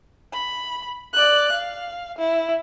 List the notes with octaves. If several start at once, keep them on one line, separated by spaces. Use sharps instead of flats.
B5
D5 F#6
F5
E4